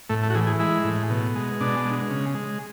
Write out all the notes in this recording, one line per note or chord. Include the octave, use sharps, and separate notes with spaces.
A2 A3
A3
F#4
E3 G#4
G#4
G#3 E4
A2
B2
G#3
B2 D4
G#3
C#3
G#3